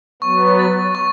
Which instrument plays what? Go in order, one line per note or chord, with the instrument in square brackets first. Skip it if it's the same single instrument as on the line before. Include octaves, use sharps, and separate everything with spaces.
[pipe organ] F#3 B3 [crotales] C#6
[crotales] A6
C#6